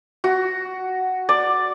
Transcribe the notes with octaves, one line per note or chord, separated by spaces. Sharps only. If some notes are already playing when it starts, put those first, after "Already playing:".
F#4
D5